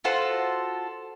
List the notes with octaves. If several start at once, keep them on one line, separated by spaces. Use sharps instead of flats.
F4 F#4 A4 C5